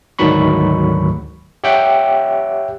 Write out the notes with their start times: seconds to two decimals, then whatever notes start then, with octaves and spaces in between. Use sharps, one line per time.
0.19 D2 G#2 D#3 F#3 B5 C#6
1.64 G4 C#5 E5 F#5 G5